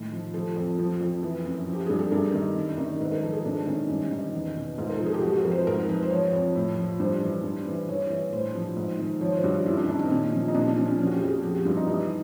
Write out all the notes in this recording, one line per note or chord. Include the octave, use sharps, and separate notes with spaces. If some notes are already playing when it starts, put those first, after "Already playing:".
Already playing: A2 D#3
F3
F3 A4
F2
F3
F2
E3
F#2
F3
G4
G2 G#4
A4
G2 A#4
D#3
F#2
D#3
G#2 B4
A#4
F3 A4
G#4
G#2 D4
D#3 C#4
G2 C#4
D#3
E2
B2
G#2 F4
A#4
F3 A4
G#4
G4
F3 F#4
F#4
F2 A#4
C5
B4
G#2 A#4
F3 B4
C5
F3 C#5
F2
A2
F3
G2 C5
E3
G2
E3
G2 C#5
E3
A2 C5
F3
G#2
D#3
F3 C#5
C5
G2 F#4
F4
F#2 E4
D4
D#3 D4
C4
A#2 C#4
F3
D#4
A#2 D4
D4
F3 C#4
C#4
F3 C#4
F#4
G4
F2
G#4
F3 G4
F#4
G2 F4
D#4
E3 D#4